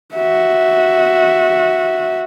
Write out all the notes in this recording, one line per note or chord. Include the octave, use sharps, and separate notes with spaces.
F#4 E5